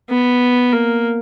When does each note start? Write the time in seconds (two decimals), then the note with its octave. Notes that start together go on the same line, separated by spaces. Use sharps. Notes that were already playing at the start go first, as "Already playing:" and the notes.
0.09 B3
0.73 A#3